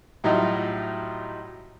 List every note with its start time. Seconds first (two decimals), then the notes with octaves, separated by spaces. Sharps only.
0.24 A2 F#3 G3 D#4 F4